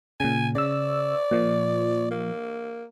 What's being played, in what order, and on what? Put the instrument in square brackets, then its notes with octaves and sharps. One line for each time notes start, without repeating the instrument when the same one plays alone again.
[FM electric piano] A#2 C#3 [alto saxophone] G#5
[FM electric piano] C#3 E6 [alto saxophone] D5
[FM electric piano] A#2 F3
[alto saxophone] A#3